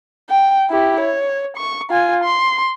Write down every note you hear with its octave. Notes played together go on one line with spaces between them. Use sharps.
G5
E4 G4
C#5
C#6
F4 G#5
C6